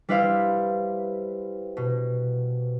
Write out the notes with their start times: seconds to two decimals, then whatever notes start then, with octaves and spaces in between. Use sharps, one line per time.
0.09 G3 E4 B4 C5 F5
1.77 B2